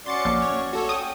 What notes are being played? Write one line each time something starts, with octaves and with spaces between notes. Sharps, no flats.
C#4 F#4 D5 C6 A6 C#7
A#1
C#5
A3 F#4 A4 C#5
C#4 G5 D#6